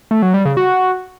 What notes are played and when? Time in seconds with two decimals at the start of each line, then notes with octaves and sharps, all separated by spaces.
0.11 A3
0.22 F#3
0.34 G3
0.45 C#3
0.57 F#4